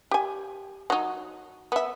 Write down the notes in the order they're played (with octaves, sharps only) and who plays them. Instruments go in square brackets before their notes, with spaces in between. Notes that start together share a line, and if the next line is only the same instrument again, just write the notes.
[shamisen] G4 G#5
F#3 D#4
B3 E5